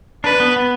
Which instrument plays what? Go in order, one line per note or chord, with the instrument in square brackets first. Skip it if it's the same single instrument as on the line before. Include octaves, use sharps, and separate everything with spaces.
[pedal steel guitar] D4 [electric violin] B4
[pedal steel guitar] B3
B3